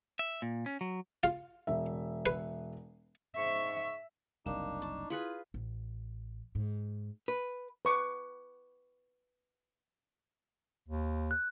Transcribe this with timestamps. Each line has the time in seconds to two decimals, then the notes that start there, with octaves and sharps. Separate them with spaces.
0.19 E5
0.42 A#2
0.66 C#4
0.81 F#3
1.23 F4
1.67 E1 E5
2.26 B4
3.36 G#2 E5 C#6
4.46 F#1 C2 D4 D#4 A#4 F5 E7
4.82 A5 C#6
5.10 E4 F4 G#4 B4 C6 F#7
5.54 A1
6.55 G#2
7.28 B4
7.85 B4 C#6 D6
10.88 D#2
11.31 F#6